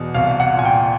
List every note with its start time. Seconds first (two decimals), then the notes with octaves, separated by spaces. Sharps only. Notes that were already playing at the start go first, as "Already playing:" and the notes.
Already playing: E2 B2
0.14 C2 F5
0.40 F#5
0.52 A#2
0.59 G#5
0.65 G5